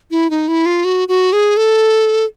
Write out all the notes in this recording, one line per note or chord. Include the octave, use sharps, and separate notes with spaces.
E4
D#4
E4
F4
F#4
F#4
G#4
A4